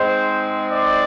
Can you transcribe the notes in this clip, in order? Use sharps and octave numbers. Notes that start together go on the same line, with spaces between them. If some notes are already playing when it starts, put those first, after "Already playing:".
Already playing: G#2 G#3 C4 C5
D5